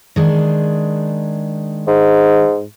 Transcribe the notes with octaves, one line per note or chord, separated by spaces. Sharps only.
D#3 G#3 D4
G#2